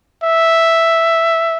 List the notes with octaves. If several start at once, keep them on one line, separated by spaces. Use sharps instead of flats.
E5